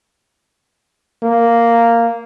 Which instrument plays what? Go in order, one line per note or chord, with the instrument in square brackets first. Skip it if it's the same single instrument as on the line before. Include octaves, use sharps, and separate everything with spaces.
[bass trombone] A#3